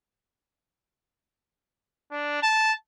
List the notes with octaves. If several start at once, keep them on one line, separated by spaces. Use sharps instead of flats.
D4
A5